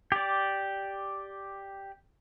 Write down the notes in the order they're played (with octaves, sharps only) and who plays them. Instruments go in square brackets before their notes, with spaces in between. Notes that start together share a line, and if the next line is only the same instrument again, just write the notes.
[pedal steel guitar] G4 D5